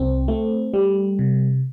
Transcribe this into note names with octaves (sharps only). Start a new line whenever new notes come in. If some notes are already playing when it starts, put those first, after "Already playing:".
Already playing: C2 C4
A3
G3
C3